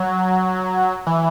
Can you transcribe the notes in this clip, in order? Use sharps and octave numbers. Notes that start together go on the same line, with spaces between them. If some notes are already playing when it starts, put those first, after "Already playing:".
Already playing: F#3
E3